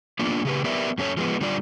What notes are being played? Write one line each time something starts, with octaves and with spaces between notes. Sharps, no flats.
A#3 B3 D4 F4
C#3 G4 B4
B3 G4 A#4 B4 D5 E5
F#2 C#4 A4 C#5
F3 G#3 B3
D3 G3 F4 D5